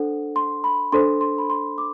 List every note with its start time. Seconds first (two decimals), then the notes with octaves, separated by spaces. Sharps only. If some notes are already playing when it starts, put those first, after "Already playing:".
Already playing: D4 A4 C5 F#5
0.36 C6
0.64 B5
0.92 D4 A4 C5 C6
1.21 C6
1.38 B5
1.50 C6
1.78 D6